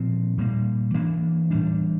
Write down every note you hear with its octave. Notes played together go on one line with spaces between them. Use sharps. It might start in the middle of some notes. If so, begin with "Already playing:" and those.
Already playing: A#2 F3 C4
A#2 G3 A#3
E3 A#3 D4
A2 E3 G3 D4